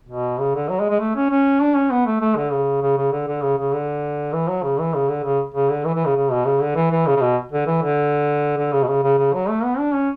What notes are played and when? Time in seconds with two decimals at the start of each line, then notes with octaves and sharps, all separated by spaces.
0.09 B2
0.40 C#3
0.55 D3
0.69 F#3
0.80 G#3
0.90 G#3
1.00 A3
1.16 C#4
1.30 C#4
1.61 D4
1.75 C#4
1.91 B3
2.06 A3
2.21 A3
2.36 D3
2.52 C#3
2.82 C#3
2.97 C#3
3.12 D3
3.27 D3
3.42 C#3
3.58 C#3
3.73 D3
4.33 E3
4.48 F#3
4.63 C#3
4.79 E3
4.94 C#3
5.09 D3
5.24 C#3
5.54 C#3
5.70 D3
5.85 E3
5.95 E3
6.05 C#3
6.16 C#3
6.31 B2
6.46 C#3
6.61 D3
6.76 E3
6.91 E3
7.06 C#3
7.16 C#3
7.21 B2
7.52 D3
7.67 E3
7.83 D3
8.58 D3
8.72 C#3
8.83 B2
8.88 C#3
9.03 C#3
9.18 C#3
9.34 F#3
9.49 A3
9.64 B3
9.79 D4
9.94 C#4